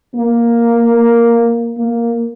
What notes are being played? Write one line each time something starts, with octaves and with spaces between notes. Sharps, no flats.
A#3
A#3